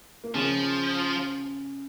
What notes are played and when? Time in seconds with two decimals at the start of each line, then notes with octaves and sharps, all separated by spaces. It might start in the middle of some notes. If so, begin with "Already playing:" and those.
0.24 A#3
0.35 C#3 F3 C#4